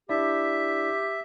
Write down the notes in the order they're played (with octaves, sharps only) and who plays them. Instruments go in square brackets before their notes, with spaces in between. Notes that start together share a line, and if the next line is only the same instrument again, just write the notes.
[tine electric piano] D4 E4 D5 [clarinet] G4 [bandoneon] E5